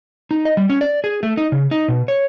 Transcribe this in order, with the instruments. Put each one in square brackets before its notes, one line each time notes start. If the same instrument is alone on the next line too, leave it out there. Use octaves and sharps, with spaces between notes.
[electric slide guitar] D#4
D#5
G3
C#4
D5
G#4
A3
D#4
C#3
D#4
B2
C#5